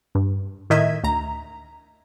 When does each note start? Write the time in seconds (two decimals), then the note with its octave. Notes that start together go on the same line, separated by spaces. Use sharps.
0.15 G2
0.70 A2 D#3 D#5 E5 G#6 B6
1.04 D2 A#5